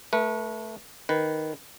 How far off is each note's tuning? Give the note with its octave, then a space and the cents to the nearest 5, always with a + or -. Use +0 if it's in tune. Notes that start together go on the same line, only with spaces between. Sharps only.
A3 +0 B4 -35
D#3 +0 B4 +0